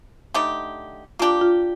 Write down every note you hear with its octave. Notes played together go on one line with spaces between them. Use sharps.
D3 A3 D#4 G4
A#3 D4 F4 G4
F4